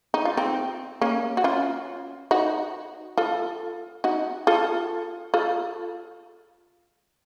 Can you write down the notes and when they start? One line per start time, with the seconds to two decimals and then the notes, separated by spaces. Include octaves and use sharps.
0.14 D#4
0.25 F4
0.37 C4 D#4
1.01 A#3 C#4
1.37 F#4
1.44 C#4 F4
2.31 D#4 F#4
3.17 F4 A4
4.04 D#4 F#4
4.47 F4 A4
5.34 F4 A4